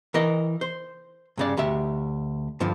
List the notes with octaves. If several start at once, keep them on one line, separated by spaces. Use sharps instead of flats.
E3 A#4 D#5
C5
G2 C#3 D5
D2 G4 E5
G2 D3 F3